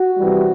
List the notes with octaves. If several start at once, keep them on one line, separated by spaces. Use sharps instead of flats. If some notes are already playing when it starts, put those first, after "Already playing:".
Already playing: F#4
C3 E3 G3